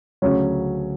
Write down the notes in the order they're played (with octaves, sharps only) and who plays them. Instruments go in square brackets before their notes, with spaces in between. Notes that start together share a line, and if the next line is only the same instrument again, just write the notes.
[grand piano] D2 C#3 F#3 C#4